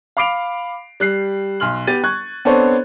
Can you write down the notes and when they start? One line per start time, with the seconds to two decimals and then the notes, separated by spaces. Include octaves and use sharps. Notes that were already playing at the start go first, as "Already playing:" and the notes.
0.17 F5 B5 D6 C7 D7 F7
1.00 G3 F#6 C7
1.60 B1 C6 F6 F#7
1.87 B3 G4 A6 D#7
2.04 C#6 F#6 G#6
2.45 B3 C4 D4 A4 C5 C#5